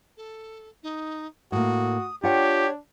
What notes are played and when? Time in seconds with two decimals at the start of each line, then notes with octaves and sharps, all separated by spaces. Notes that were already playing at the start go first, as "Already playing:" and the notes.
0.17 A4
0.83 D#4
1.52 A2 A#3 F#4 D#6
2.23 D4 F4 G4 C#5 F#5 G5